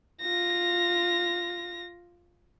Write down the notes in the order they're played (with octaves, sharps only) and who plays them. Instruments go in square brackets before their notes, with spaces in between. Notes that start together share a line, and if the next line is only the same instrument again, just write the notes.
[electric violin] F4 A#6